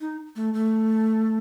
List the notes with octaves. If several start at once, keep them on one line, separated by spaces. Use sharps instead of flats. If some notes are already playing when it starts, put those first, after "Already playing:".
D#4
A3
A3